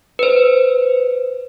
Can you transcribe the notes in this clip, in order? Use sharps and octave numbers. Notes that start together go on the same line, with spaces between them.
B4 C5